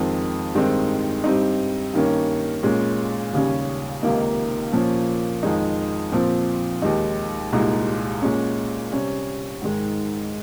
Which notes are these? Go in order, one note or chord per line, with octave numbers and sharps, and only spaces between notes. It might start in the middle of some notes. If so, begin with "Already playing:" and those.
Already playing: F2 D#3 G#3 C4
G2 D#3 G#3 C4 D#4
G2 G3 C4 D#4
G2 D#3 A#3 C#4
A#2 G#3 C#4
D#2 C#3 G3 C#4
C#2 C3 D#3 A#3 D#4
A#2 F3 A#3 C#4
F2 D#3 G#3 D#4
A#2 F3 C4
D#2 D#3 G#3 D#4
C2 A#2 G#3 D#4
A#2 G#3 C#4
C3 G3 C#4
G#2 D#3 G#3